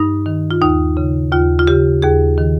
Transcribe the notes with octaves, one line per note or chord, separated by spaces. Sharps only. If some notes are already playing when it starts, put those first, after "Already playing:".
Already playing: G2 D#4
D#3
F4
D#2 D#4
C#3
D#2 F4
F4
C#3 G4
D#2 G#4
D#3